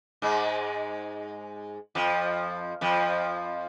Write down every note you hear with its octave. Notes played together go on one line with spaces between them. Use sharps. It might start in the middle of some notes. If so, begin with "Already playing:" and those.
G#2 G#3
F2 F3
F2 F3